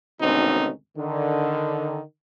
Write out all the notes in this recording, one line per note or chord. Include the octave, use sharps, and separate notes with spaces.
G#1 D2 B2 C4 C#4 D#4
D3 D#3